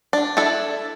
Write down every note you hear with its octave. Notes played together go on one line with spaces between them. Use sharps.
D4
D4 E4 A4